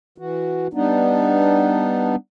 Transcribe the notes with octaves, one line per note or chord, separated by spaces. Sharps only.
E3 F#4
G3 B3 D4 D#4